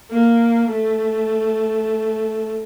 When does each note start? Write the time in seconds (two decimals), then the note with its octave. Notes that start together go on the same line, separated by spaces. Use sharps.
0.10 A#3
0.69 A3